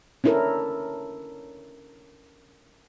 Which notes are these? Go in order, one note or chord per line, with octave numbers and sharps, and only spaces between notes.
C#4 D4 E4 A4 A#4